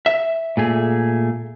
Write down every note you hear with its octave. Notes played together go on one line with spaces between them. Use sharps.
E5
A#2 A3 G#4